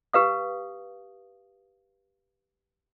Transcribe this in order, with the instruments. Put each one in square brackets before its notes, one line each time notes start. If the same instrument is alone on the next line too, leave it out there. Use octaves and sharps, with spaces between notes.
[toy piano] G4 B4 F5 D#6